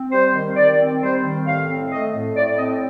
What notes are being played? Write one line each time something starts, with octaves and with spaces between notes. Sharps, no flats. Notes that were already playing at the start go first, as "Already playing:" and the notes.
Already playing: C4
G3 C5
D#3
D#3 D5
C4
G3 C5
D#3
A2 F5
C4
A3 D#5
A2
A2 D5
C4 D#5